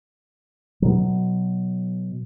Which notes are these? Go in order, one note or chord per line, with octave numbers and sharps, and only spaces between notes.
B2 F#3